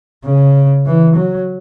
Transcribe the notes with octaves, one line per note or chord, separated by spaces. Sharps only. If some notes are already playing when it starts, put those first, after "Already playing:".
C#3
E3
F#3